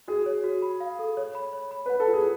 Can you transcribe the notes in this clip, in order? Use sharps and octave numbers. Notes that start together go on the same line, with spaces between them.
F#4 G#4
C#5
F#4
B5
F5
A4
C#5
B5
C#5
B5
B4 F#5
A4
F4
G#4